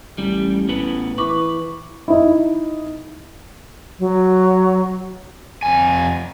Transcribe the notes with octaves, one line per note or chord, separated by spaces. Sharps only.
A1 G3
A2 B3 B4
E3 B4 C#6 D6
D#4 E4
F#3
F2 G#5